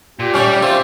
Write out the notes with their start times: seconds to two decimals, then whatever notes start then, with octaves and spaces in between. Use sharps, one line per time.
0.19 A#2 G4
0.34 A2 G3 C#4 D#4 G#5
0.63 C4 E4 F4 C5